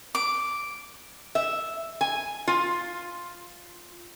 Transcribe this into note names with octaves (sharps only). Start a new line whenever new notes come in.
D6
E5
G#5
F4